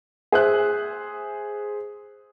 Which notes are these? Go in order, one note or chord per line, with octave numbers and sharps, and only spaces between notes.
G#4 C5 E5 F#6